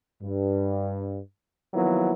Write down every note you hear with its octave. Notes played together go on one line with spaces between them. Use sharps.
G2
D#3 F3 F#3 A#3 B3 E4